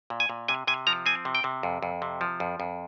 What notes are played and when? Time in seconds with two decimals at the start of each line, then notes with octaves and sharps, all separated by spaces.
0.10 A#2
0.20 G#5
0.30 A#2
0.48 C3 G#5
0.67 C3 G#5
0.87 F3 A#5
1.06 C4 G#5
1.25 C3
1.35 G5
1.44 C3
1.63 F2
1.83 F2
2.02 C3
2.21 F3
2.40 F2
2.60 F2